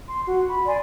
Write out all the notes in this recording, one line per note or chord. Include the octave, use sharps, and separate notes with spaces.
C6
F#4
B5
D5 G#5 C6